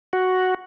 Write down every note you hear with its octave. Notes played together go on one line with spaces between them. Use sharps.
F#4